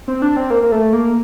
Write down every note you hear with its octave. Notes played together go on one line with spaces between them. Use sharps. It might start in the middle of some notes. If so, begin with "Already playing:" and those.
C4
D4
C4
A#3
A#3
A3
A#3